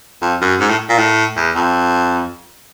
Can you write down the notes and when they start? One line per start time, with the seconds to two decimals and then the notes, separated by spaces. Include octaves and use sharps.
0.22 F2
0.42 F#2
0.60 G#2
0.70 A2
0.89 A#2
0.99 A2
1.37 E2
1.55 F2